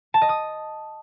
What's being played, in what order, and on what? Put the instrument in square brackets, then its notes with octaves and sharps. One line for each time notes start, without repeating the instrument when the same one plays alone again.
[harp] A5
D#5
D#6